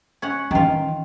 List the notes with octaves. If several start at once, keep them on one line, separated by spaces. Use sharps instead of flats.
C#4 F#5
D#3 E3 C#4 F4